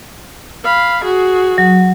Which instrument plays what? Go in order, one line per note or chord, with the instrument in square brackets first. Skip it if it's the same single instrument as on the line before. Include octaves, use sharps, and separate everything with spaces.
[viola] F5 B5
F#4 G#4
[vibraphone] F#3